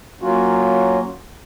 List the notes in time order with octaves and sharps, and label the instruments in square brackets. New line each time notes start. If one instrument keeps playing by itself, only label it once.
[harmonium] F#3 A#3 C#4 F4 F#4